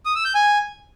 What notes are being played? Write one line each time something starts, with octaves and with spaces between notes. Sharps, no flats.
D#6
E6
G6
G#5